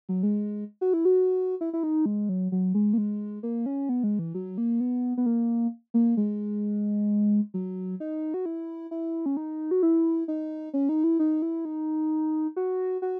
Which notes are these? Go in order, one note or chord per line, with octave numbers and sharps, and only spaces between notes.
F#3
G#3
F#4
E4
F#4
E4
E4
D#4
G#3
F#3
F#3
G#3
A#3
G#3
A#3
C#4
B3
G#3
E3
F#3
A#3
B3
B3
A#3
A#3
G#3
F#3
D#4
F#4
E4
E4
C#4
D#4
F#4
E4
D#4
C#4
D#4
E4
D#4
E4
D#4
F#4
F#4